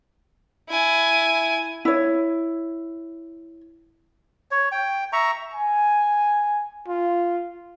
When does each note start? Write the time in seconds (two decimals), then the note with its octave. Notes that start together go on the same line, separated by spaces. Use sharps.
0.69 E4 G#5
1.85 E4 C#5
4.51 C#5
4.72 G5
5.13 E5 A#5 C#6
5.54 G#5
6.88 F4